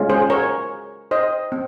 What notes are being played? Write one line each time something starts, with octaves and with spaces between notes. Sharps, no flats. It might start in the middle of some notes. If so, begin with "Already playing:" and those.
Already playing: G#3 C#4 F4
G#4 C5
A#4 C#5
C5 D#5
C4